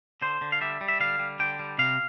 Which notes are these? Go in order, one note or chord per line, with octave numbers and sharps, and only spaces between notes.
D3 C5
D3
F5
G3 E5
G3
E5
D3 F5
G3
D3 G5
G3
C3 F5